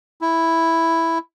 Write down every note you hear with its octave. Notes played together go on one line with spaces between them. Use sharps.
E4